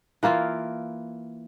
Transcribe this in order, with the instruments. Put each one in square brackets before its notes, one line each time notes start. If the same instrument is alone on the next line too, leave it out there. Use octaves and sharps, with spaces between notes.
[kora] E3 A#3 E4 F4